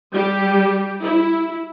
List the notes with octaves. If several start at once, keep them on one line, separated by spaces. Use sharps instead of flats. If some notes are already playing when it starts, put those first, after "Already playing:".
G3 G4
E4